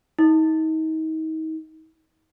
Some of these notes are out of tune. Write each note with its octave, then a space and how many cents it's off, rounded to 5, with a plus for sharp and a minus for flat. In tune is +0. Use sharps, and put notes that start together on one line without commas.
D#4 +35